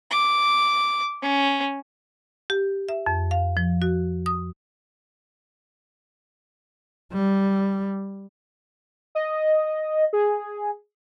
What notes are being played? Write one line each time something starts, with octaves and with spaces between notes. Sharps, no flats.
D6
C#4
G4
E5
F2
F5
F3
F#4
D#6
G3
D#5
G#4